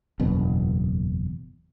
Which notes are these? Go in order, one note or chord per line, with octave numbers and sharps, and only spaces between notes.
F#1 E2 B2 B3